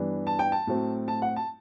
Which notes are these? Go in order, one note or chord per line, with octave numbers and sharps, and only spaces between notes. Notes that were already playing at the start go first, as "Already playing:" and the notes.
Already playing: G2 E3 B3 D4
A5
G5
A5
A2 F#3 A3 C4
A5
F#5
A5